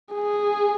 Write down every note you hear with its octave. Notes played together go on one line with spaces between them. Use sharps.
G#4